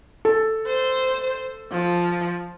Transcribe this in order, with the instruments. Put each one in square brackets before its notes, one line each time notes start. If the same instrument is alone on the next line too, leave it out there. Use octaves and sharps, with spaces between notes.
[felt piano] A4
[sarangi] C5
F3